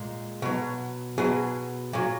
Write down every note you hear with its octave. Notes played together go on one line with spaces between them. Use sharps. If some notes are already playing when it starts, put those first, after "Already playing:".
Already playing: A#2 G#3
B2 F#3
B2 F#3 G#4
A#2 F#3